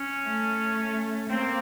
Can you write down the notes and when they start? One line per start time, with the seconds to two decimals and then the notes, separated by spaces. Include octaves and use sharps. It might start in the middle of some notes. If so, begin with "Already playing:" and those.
Already playing: C#4
0.27 A3
1.29 A#3 C4